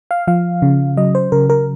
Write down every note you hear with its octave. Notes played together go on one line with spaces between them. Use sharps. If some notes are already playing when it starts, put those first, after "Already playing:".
F5
F3 F5
C#3
F#3 D#5
C5
C#3 A#4
A#4